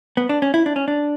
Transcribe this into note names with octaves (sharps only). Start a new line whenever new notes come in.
B3
D4
C#4
E4
D4
C#4
D4